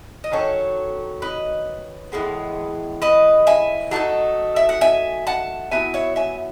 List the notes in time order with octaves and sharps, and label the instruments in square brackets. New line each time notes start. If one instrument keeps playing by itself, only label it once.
[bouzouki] D#5
D#3 F#3 C#4 A4 C#5
B4 D#5
A2 E3 G#3 B3
B4 D#5
E5 G#5
F#3 A3 D#4 A5
E5
F#5
E5 G#5
F#5 A5
F#3 B3 E4 E5 G#5
C#5 E5
E5 G#5